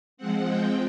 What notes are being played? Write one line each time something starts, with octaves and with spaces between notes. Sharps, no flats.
F3 G#3 C4 F#5
G5